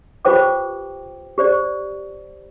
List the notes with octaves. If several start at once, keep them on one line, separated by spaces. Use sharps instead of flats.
F4 G4 B4 C5 G5 D6
G4 C5 D5